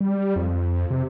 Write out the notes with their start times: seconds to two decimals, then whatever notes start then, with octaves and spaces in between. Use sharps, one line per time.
0.01 G3
0.36 F2
0.90 C3